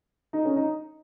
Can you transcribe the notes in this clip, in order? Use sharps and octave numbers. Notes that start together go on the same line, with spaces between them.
D#4
C#4
D#4